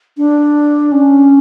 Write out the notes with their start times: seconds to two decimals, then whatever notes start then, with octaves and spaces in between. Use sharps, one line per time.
0.18 D4
0.92 C#4